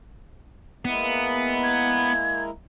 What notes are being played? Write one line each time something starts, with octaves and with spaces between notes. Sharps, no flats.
G#3 A#3 B3 E4
G#6